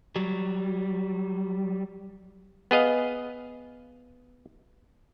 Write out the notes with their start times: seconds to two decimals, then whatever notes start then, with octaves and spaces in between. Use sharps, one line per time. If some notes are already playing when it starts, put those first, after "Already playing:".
0.16 F#3 G3
2.71 B3 G#4 D#5 F5